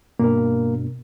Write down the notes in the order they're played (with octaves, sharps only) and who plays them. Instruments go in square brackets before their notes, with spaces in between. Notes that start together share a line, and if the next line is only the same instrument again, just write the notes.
[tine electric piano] G2 B2 D4 [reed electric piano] A#3 A#4